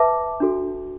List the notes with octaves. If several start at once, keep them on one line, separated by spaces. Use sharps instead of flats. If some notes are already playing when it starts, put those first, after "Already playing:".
Already playing: B4 E5 A5 D6
D4 F#4 A4